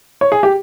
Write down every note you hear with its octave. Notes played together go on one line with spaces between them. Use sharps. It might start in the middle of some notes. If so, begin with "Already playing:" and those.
C#5
G#4
G4